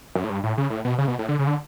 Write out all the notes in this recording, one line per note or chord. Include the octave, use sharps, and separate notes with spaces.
F#2
A2
G2
A2
C#3
A2
B2
C#3
B2
A2
D3
C#3
D3